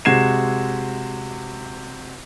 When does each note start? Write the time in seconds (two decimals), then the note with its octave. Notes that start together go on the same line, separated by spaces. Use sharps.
0.05 C3 G#3 F#4 G#6 C7 E7